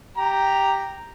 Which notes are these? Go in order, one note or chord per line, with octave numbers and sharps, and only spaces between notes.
G4 A#5